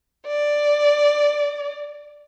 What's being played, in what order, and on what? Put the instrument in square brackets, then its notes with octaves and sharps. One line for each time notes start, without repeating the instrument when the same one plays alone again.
[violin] D5